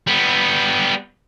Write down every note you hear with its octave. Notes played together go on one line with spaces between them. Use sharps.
G3 B3